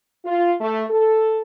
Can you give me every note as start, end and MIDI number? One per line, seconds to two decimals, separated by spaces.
0.24 0.53 65
0.59 0.83 57
0.90 1.40 69